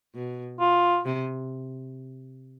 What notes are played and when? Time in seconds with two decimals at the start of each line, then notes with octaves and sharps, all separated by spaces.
0.15 B2
0.60 F4
1.05 C3